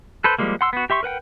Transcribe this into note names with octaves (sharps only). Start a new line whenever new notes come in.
A4 B4 C5
F3 G3 G#3 A#3
F#5 C6 E6
B3 F#4
G4 E5 C6 C#6
A#4 B4 F#5 G5